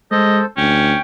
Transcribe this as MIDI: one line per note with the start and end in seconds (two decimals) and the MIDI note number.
0.11 0.42 56
0.11 0.46 69
0.11 0.46 72
0.11 0.40 75
0.57 0.95 38
0.57 1.00 61
0.57 1.01 79